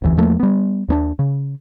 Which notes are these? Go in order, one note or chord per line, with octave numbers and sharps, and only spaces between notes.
F1 D2 E3
E2 F3 A3 A#3
G3 B3
D#2 B3 D4
C#3